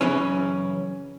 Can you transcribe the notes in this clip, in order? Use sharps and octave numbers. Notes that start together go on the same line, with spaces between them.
F#2 C#3 E3 C#4